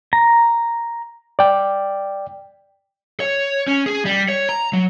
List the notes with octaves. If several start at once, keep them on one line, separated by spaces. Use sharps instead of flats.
A#5
D5 G5
C#5
C#4
G#4
G3
C#5
A#5
F#3